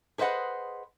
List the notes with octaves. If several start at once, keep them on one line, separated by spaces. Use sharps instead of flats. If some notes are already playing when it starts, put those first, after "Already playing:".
G#4 B4 C5 D#5 F#5